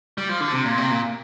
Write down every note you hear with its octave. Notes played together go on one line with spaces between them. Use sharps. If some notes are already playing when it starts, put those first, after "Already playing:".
G3
F3
D3
C3
A#2
C3
A#2